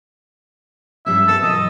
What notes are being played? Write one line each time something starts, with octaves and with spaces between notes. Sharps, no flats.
G2 G3 C#4 E5
B3 A4 C5 A5
B2 E3 F#3 D#5